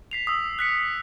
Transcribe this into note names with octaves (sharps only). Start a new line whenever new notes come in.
B6 C7 F7
D#6 E6
F#6 B6 C#7